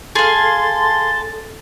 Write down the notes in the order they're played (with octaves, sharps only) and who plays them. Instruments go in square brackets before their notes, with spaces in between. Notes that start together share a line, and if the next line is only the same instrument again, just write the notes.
[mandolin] G#4 F5 [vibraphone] A4 [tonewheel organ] A5 [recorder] C6